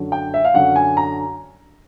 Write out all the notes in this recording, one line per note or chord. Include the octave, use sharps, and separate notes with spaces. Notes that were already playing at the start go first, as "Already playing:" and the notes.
Already playing: F#2 D3 F#3
G5
E5
F5
F#2 D3 F#3 F#5
G#5
A#5